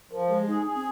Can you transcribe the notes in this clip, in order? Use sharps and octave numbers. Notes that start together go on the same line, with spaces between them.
F3 A#4
G#3 G#4
D#4 G#4
G#4
C4